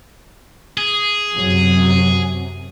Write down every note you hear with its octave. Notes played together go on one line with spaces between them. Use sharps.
G#4
F#2 C3 F#3